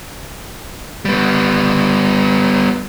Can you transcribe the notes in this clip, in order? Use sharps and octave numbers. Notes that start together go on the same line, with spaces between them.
G3 B3